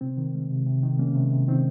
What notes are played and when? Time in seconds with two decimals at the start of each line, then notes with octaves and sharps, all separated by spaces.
0.01 C3 C4
0.17 D#3
0.34 G#3
0.50 C3
0.66 C3
0.83 D#3
0.99 G#3 A#3 C#4
1.15 C3
1.32 C3
1.48 D#3 C4 D#4